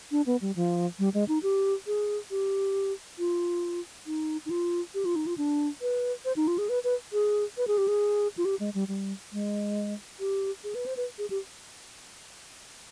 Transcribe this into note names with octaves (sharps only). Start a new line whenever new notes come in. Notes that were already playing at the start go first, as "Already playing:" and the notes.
D4
B3
G3
F3
G3
G#3
D#4
G4
G#4
G4
F4
D#4
D#4
F4
G4
F4
D#4
F4
D4
B4
C5
D#4
F4
G#4
B4
B4
G#4
B4
G#4
G4
G#4
F4
G4
G#3
G3
G3
G#3
G4
G#4
B4
C5
B4
G#4
G4